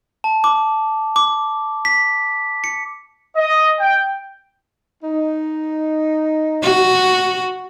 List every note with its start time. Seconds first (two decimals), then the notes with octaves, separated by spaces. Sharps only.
0.24 A5
0.44 D6
1.16 D6
1.85 B6
2.64 C#7
3.37 D#5
3.80 G5
5.04 D#4
6.63 F#4